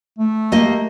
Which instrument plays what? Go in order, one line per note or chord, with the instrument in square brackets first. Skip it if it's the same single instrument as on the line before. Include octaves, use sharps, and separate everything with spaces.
[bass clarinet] A3
[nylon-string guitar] A#3 G4 D#5